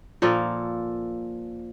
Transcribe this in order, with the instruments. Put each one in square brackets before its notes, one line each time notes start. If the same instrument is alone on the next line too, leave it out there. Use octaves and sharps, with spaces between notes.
[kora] A#2 F3 A#3 A4